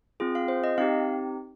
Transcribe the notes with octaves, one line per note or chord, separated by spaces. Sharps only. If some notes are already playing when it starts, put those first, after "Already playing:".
C4 F4 G#4
F5
C5
D#5
C4 D#4 G4 F5